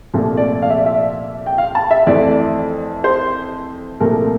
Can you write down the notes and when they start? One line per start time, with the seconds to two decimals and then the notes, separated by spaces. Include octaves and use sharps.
0.14 C2 A#2 F3 A3
0.37 D5
0.62 F5
0.70 E5
0.78 D5
0.86 E5
1.46 G5
1.58 F5
1.75 A5
1.91 E5
2.07 F2 E3 A3 D5
3.04 C5
4.00 C2 A#2 F3 A3 A#4